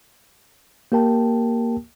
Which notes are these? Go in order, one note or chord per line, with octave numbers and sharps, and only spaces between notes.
A#3 G4 A#4 G5 A5